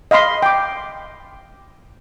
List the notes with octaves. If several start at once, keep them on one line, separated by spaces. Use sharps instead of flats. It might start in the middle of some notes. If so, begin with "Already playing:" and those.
D#5 F5 B5 C6
G5 D6